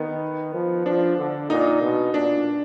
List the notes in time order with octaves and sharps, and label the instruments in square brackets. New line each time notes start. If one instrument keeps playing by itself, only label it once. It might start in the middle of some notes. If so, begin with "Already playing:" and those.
Already playing: [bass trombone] D#3 [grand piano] B3
[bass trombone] F3
[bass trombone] F3 [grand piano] D4
[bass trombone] D3
[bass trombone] A#2 [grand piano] D#4
[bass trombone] B2
[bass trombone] A#2 [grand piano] D4